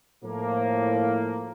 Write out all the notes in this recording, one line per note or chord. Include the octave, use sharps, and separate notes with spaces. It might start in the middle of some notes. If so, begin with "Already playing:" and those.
A2 F3 A#3